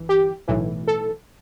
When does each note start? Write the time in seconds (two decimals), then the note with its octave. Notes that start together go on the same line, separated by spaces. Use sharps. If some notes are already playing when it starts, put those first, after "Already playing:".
Already playing: G1 E3
0.09 G4
0.48 B1 A2 E3
0.88 A4